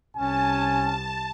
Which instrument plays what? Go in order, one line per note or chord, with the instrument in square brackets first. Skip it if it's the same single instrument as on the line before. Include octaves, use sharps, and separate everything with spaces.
[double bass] C2 [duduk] C#4 [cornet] G#5 [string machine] A5